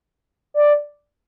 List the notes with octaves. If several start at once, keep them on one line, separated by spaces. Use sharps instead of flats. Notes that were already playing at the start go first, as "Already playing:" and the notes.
D5